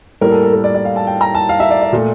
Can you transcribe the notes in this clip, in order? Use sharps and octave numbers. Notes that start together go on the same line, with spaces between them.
A2 G3 A#3 A#4
A4
A4
A#4
D5
D5
F5
A5
G5
A#5
A5
F5
E5
D5
D5
A#2 A3